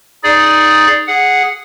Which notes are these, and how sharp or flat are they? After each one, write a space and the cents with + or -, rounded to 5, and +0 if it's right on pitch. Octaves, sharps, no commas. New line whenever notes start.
D#4 +0 G#4 +0 D5 +0
G#4 -5 F#5 -5